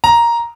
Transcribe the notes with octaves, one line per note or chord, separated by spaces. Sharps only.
A#5